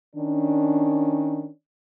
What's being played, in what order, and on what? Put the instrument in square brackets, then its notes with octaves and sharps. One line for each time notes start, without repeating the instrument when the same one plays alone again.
[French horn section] D#3 C#4 D4